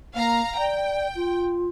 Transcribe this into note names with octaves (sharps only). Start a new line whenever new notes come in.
A#3 F5 A#5
D5 G5
F4